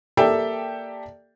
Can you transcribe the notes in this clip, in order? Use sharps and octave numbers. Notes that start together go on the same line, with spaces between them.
A#3 G4 A4 D5 E5 G5